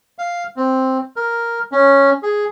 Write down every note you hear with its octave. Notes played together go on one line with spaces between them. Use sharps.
F5
C4
A#4
C#4
G#4